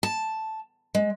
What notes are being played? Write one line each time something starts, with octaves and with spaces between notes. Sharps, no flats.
A5
G#3